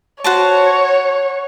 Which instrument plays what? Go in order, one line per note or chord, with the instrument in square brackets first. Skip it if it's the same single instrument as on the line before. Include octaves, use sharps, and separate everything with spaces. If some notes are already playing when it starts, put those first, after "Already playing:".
[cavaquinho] F#4 C5 A5 [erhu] C#5